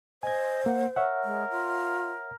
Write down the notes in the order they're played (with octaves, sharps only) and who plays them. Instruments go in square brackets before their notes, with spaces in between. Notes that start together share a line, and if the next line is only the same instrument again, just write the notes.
[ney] C5 [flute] D#5 [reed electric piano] G#5 G#6
[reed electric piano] A#3 [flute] F#5
[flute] A#4 [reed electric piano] C#5 E5 F#5
[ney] G#3
F4